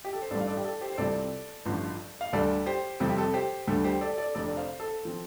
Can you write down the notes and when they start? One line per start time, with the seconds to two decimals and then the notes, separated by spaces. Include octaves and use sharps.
0.05 G4
0.13 A4
0.22 C5
0.31 A1 G2 G3 A4 D5
0.40 F5
0.48 A4 D5
0.57 G4
0.65 A4
0.81 G4 C5
0.93 C5
0.98 C2 C3 G3 C4 F4 A4 D5
1.66 A1 G2 D3 F3
2.21 F5
2.33 D2 D3 G3 D4 A4 D5
2.66 G4 C5
3.00 F2 C3 G3 C4 F4 A4
3.09 G4
3.18 A4
3.34 G4 C5
3.67 D2 D3 G3 A4
3.84 G4 C5
4.01 A4 D5
4.18 A4 D5
4.35 F1 F2 D3 A4 D5
4.57 C5 F5
4.80 A4
5.05 F3 C4